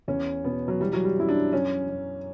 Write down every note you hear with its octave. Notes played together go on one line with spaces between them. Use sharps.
E2 C#4
B2 B3
F#3
E3 G3
F#3
G3
F#2 E4
D4
F#2 C#4
F#2